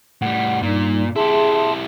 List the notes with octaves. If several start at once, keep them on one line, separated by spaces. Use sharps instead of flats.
A2 G3 F#5
G2 A#2 G3 D#4
E4 G4 G#4 E5 A5 C6